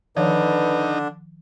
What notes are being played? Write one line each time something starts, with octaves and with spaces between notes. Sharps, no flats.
D3 D#3 F3 D4 D#4 B4 C#5